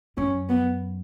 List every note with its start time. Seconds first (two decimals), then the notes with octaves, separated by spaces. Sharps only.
0.17 F#2 C#4
0.49 B3